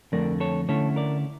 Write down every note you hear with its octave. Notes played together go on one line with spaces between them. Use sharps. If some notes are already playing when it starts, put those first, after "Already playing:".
F2 D3 F3 A3 A#4 D5
A4 C#5
D3 A3 C#4 E4 A4 C#5
A#4 D5